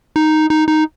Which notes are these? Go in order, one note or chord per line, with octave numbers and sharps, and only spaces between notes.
D#4
D#4
D#4